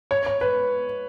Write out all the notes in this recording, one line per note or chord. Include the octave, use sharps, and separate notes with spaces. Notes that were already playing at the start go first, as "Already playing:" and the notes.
C#5
C#5
B4